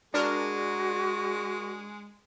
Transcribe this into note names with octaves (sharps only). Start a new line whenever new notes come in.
G#3 D4 F#4 G#4 A#4